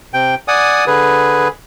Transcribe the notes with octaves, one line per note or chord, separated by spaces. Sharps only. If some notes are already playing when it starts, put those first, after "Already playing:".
C3 G5
D5 F#5 G#5 D#6
D3 G#4 B4